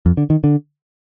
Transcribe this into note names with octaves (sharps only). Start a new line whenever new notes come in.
F2
D3
D#3
D3